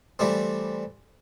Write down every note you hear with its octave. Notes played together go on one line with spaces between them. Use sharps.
E3 G3 A3 C4